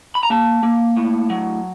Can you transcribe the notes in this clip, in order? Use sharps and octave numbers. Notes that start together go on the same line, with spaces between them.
B5
A#5
A#3 A5
A#3
A2
F#3